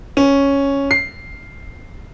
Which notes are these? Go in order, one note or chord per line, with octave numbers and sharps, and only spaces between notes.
C#4
C7